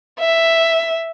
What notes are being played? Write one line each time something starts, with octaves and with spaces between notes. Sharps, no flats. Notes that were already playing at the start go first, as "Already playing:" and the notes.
E5